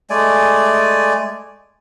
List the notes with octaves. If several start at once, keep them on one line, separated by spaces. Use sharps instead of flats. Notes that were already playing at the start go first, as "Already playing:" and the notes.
G#3 A3 D5 G#5